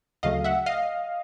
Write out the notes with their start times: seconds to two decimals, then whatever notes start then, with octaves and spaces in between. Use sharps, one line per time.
0.23 D2 C#3 F#3 A3 D#5 F5
0.44 E5 F#5
0.66 D#5 F5